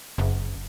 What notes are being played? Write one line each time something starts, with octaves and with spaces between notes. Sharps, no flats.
F#1